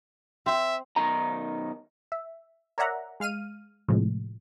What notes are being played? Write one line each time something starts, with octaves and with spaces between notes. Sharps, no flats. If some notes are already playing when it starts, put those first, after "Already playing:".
C4 E5
B1 D#3 D#4 A#5
E5
A#4 C#5 D5 E5 F#5 A#5
G#3 F5 F6 D#7
A2 C3 F3 G#3